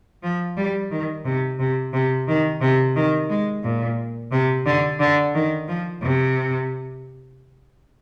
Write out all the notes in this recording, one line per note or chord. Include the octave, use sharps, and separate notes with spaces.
F3
G3
D#3
C3
C3
C3
D#3
C3
D#3
G#3
A#2
C3
D3
D3
D#3
F3
C3